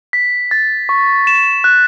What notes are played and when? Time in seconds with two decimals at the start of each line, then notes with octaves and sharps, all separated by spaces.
0.13 B6
0.51 A6
0.89 C#6
1.27 E7
1.64 F#6